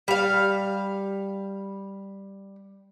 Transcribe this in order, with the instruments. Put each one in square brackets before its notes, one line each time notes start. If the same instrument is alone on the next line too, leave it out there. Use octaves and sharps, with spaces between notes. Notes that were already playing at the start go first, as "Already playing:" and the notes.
[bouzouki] G3 F5